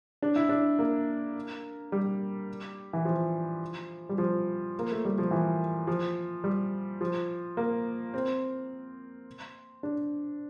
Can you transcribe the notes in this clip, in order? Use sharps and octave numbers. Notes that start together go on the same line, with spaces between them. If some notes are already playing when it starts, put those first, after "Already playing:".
D4
E4
D4
A#3
G3
E3
F3
G3
F3
A#3
A3
G3
F3
E3
F3
G3
F3
A#3
C4
D4